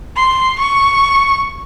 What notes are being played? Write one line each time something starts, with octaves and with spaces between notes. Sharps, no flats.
C6
C#6